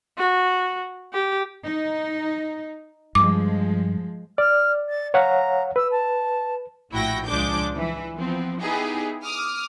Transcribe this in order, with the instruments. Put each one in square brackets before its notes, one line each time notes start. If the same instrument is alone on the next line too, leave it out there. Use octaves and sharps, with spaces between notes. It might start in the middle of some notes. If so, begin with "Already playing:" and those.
[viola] F#4
G4
[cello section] D#4
[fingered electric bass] G2 [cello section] F3 G#3 [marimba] D6
[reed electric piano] D5 [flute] F6
[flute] A6
[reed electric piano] C#5 F5 F#5 [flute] A#5
[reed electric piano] B4 [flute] E6
[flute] A5
[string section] A#1 A2 E4 F#4 G5 A#6
C#2 F3 G#3 D4 D6 G6
E3
F3 B3 C4
B3 D#4 E4 G4 G#4
D6 D#6 F6